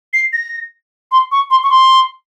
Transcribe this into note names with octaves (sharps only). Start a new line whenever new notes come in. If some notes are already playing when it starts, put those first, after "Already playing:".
C7
A#6
C6
C#6
C6
C#6
C6